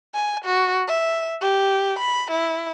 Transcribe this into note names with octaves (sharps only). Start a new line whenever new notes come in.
G#5
F#4
E5
G4
B5
E4